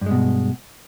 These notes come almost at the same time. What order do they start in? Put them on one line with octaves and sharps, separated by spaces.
G2 G#3 B2